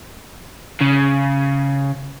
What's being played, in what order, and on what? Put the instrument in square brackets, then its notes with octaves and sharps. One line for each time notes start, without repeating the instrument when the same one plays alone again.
[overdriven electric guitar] C#3